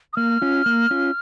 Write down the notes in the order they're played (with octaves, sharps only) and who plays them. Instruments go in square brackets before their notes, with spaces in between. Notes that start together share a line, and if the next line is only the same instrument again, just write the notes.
[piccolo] D#6
[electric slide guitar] A#3 [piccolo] F6
[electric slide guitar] C#4 F4
A#3
C#4 F4